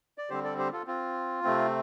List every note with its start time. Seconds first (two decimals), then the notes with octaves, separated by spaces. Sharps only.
0.18 D5
0.30 D3 G3 C4 G4 C5
0.44 A4 D5
0.58 G4 C5
0.73 F4 A4
0.87 C4 F4
1.44 C3 A3 C4